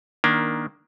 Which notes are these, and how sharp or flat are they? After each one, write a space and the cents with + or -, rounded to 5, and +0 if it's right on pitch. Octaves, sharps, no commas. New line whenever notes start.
D#3 +0 A#3 +15 D4 +0